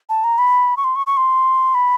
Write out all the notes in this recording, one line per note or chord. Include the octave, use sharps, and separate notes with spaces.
A5
A#5
B5
C#6
C6
C#6
C#6
C6
B5